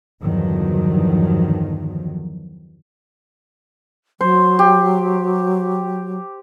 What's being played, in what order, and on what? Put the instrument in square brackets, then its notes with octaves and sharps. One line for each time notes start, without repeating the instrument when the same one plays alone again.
[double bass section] E2 G2 D3 D#3 F3 F#3
[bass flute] F#3 [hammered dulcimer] C5
[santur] G4